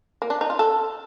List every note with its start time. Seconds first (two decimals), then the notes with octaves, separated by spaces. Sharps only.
0.22 A#3
0.30 D4
0.41 D#4
0.50 F4
0.59 A4